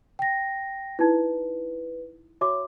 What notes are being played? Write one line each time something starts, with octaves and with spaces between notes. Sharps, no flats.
G5 A#6
D#4 E4 B4
F#4 C#5 E5 D6